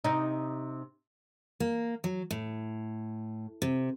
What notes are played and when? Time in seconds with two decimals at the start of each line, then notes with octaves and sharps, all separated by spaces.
0.04 C3 D#4
1.60 A#3
2.04 F#3
2.31 A2
3.62 C3